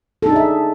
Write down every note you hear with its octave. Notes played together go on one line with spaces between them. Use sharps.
D4 D#4 G#4 A4 E5